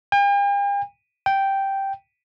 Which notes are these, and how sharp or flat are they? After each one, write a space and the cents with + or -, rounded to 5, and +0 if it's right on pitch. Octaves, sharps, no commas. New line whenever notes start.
G5 +45
G5 -5